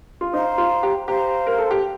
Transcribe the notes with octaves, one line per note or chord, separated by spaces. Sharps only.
F4
D#4 C5 F5 A#5
F4
G4
G4 C5 F5 A#5
A#4
A4
G4